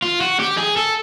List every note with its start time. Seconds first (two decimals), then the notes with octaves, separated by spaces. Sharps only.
0.02 F4
0.21 F#4
0.40 G4
0.58 G#4
0.77 A4